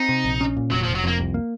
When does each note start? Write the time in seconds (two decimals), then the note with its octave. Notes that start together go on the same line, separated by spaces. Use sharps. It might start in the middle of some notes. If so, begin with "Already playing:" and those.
Already playing: C4 D#4
0.09 C3
0.24 A#1
0.41 C#4
0.56 A#2
0.71 F1 F#3
0.84 F3
0.88 F1
0.95 F#3
1.04 F2 A#3
1.19 C2
1.34 A#3